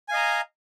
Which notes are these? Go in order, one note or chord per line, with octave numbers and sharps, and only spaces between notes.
D#5 F5 G#5 A#5